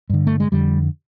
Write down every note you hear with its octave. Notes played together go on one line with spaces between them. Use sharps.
G2 D3
A3
G#3
F2 D3 G3